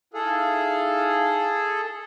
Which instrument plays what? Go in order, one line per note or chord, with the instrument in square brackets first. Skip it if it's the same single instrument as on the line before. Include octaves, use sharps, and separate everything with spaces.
[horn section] D#4 E4 F5 [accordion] G#4 A4